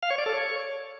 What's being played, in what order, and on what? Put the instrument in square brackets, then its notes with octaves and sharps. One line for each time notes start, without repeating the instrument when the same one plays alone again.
[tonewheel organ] F5
C#5
D5
A4
C#5